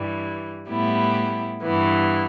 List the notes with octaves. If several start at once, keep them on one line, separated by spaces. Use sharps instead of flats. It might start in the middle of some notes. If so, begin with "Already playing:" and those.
Already playing: G2 E3 G3
A2 G3 B3 E4 G4
G2 E3 B3